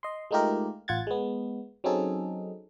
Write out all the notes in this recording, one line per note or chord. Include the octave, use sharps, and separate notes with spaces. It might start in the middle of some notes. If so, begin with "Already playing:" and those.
D#5 C6
G#3 A3 D#4 F4 G4 A#4
A1 F4 F#5 G#6 A6
G#3 B3
F#3 C4 C#4 D#4 G#4 A4